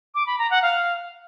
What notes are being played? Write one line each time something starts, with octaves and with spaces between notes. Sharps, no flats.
D6
B5
A#5
F#5
F5